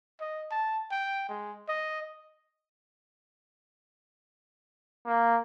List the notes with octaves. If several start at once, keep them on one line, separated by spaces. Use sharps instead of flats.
D#5
A5
G5
G#3
D#5
A#3